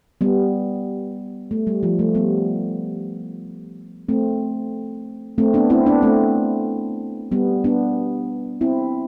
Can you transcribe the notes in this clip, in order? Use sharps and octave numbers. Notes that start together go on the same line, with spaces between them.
G3 B3
A3
G3
F3
A3
G3 B3
A3 C4
A3 C4
B3 D4
C4 E4
B3 D4
A3 C4
G3 B3
B3 D4
C4 E4